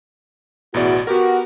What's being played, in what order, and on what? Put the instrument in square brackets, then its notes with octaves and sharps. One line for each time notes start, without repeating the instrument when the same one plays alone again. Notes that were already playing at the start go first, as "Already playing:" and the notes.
[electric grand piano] A1 B2 D5 [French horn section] E2 F#4
[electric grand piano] B3 G4 A#4 [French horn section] F#4